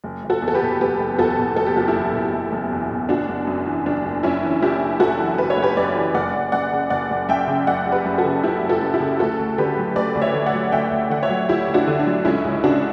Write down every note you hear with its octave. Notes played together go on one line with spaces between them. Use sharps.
F#1
F#1
F#4 A4
E2
A4
G4 B4
B2
F#1 G4 B4
F#1
E2 F#4 A4
B2
F#1 A4
G4
F#1 F#4
E4 G4
E2
B2
F#1
F#1
E2
B2
F#1 D4 F#4
F#1
F#2
E3
F#1 D4
F#1
F#2 C#4 E4
E3
F#1 E4 G4
F#1
F#2 F#4 A4
E3
F#1 B4
C#5
F#1
G4 B4
F#2 B4 D5
E3
F#1 D5 F#5
F#1
F#2 D5 F#5
C#3
F#1 D5 F#5
F#1
F#2 E5 G5
C#3
F#1 D5 F#5
F#1
G4 B4
F#2
F#4 A4
C#3
F#1 E4 G4
F#1
F#4 A4
F#2
E4 G4
C#3
D2 F#4 A4
D2
D3 G4 B4
F#3
D2 B4 D5
D2
C#5 E5
D3
D5 F#5
F#3
D2 E5 G5
D2
D3 F#5
C#5 E5
F#3
D2 E4 G4
D2
D4 F#4
D3
D4
F#3
C#2 C#4 E4
C#2
C#3 D4 F#4